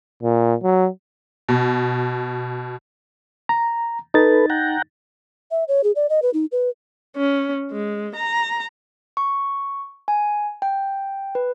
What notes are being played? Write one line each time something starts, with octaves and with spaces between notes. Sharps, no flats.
A#2
F#3
B2
A#5
D#4 A4 B4 A6
F#5 G5 A#5
E5
C#5
G#4
D5
D#5
B4
D#4
B4
C#4
G#3
A#5
C#6
G#5
G5
B4